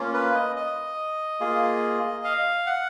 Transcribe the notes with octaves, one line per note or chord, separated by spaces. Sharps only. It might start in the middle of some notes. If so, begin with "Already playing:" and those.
Already playing: A#3 C#4 F4
B4
D#5
D#5
A#3 F4 G#4
F5
F#5